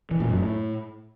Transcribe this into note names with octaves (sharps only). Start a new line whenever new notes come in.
E3
A#2
F#2
A2